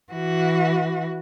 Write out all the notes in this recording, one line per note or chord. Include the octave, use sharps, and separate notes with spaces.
E3 F#4